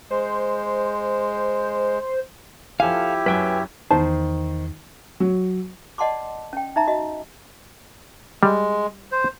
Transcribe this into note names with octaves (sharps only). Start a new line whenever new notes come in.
G#3 C5
F3 E4 G4 A4 F5 G#5
F#2 F#3 B4 G5 G#5
E2 D#3 C5 A5
F#3
D5 D#5 F#5 A5 C6 D6
C#4 G5
D#4 E5 A#5
F#4 D#5
G3 G#3
C5